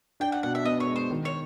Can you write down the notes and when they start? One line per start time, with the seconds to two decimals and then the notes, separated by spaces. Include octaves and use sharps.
0.20 D4 G5
0.32 F#5
0.43 B2 F#5
0.55 E5
0.65 B3 D#5
0.80 C#5
0.87 G#3
0.96 C5
1.10 D#3
1.25 C#5